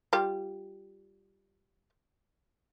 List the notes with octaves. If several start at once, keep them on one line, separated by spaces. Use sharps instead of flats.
G3 F4 G4